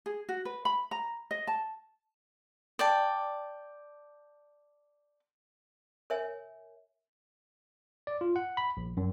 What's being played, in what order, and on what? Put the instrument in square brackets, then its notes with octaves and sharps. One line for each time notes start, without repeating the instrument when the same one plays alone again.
[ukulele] G#4
F#4
B4
B5
A#5
D#5
A5
[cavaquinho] D5 G5 A5
[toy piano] A#4 C#5 E5 G#5
[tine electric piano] D5
F4
F#5
B5
A#1
F#2